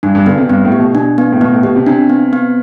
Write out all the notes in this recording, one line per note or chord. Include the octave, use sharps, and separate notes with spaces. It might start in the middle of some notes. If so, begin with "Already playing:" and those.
G2 D4
G2
D3 B3
C3
G2 B3
A2
G4
B2
B2 D4
B3
A2
B2 B3
A2
B2 G4
C3
C3 D4
B3
B3